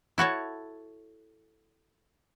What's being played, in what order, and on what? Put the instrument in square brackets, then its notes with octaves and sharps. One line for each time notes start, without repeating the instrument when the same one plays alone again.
[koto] E4 F#4 A4 C#5